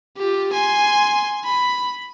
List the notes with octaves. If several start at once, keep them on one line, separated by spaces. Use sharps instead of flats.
F4 G4
G#5 C6
B5